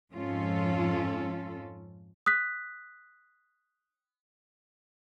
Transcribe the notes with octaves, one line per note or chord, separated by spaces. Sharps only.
F2 G#2 C#4 F4 A4
D#6 F#6 B6